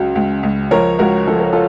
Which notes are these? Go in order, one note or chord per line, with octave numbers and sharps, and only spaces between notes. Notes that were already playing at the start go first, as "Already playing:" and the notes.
Already playing: C#2 C#3 F#3
C#2
C#2
F3 A#4 C#5
C#2 F#4 A#4
F3 A4
A#4
F4 A4